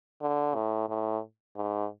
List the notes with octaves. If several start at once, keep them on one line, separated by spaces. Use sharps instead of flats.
D3
A2
A2
G#2